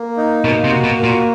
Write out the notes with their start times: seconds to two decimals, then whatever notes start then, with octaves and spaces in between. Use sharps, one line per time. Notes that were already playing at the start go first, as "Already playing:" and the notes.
Already playing: A#3
0.17 D#4
0.44 B2 A#3
0.64 C3
0.70 F#4
0.84 B2
0.97 A#3
1.03 A#2